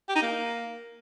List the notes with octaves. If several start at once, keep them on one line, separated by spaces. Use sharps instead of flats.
G4
D#4
A#3